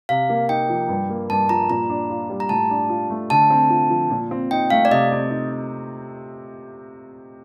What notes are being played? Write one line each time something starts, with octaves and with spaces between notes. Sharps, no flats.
C3 F5
A#3
D#4 G5
F3
G2
A#3
G2 A5
F3 A#5
A#2 A#5
D4
F4
G3
A#5
A2 A5
D4
F4
A3
D3 A5
C4
F4
F3
A#2
C4
D#4 G5
A3 F5
D5
C3 D#5
C4
D#4